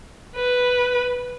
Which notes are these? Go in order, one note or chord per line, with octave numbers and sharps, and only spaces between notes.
B4